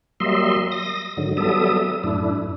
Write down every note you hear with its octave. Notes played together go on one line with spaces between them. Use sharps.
F#3 G3 A#3 D#5 E5 C6
D#6 A#6
G#2 D3 D#3 F#3
F#3 G3 B3 A4 E5 D#6
F#2 A2 D4 E4